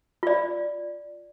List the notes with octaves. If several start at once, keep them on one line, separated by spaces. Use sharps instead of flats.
F4 D5